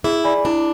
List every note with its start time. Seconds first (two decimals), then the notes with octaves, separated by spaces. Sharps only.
0.04 E4 G#4
0.24 D5 G#5 B5
0.45 D4 E4